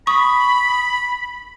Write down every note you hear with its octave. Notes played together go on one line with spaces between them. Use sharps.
B5 C#6 D#6